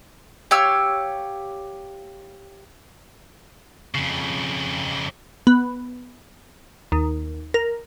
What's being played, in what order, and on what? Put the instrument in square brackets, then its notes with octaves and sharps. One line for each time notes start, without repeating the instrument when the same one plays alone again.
[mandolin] G4 C#5 F5 E6
[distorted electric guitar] F2 C#3
[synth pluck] B3
D#2
A#4